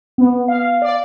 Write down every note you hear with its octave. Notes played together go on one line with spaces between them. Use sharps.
B3
F5
D5